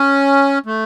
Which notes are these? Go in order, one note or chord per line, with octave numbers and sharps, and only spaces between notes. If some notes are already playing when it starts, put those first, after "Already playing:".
Already playing: C#4
A3